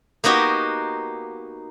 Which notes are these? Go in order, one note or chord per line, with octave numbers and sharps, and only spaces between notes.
A#3 B3 D#4 F#4 G4